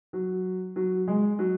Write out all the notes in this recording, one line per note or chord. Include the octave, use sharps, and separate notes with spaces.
F#3
F#3
G#3
F#3